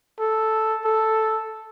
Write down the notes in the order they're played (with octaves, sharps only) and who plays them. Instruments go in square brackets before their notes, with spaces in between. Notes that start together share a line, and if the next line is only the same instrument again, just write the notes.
[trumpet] A4
A4